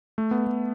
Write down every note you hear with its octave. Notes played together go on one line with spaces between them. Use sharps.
A3
B3
A3